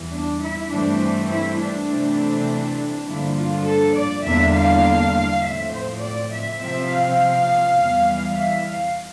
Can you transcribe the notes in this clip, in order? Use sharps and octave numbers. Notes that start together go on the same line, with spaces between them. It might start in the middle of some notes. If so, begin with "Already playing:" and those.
Already playing: E2 E3 G3
D4
E4
G2 E3 A3 C4 D4
E4
D4
C3 E3 A3 C4
G2 D3 F3 A#3 D4 E4
F4
A4
D5
E2 D3 G3 A#3 D4 E5
F5
A2 F3 C4 E5
C5
D5
E5
C3 F3 C4 E5
F5
E2 E3 G3
E5
F5